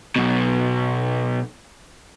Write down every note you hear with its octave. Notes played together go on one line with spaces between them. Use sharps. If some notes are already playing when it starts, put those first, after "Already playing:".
B1 B2